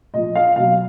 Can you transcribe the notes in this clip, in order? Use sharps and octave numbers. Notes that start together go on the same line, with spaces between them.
A#2 F3 D#5
F5
B2 F#3 F5